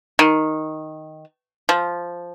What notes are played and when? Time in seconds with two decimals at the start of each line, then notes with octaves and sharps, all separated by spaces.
0.19 D#3
1.69 F3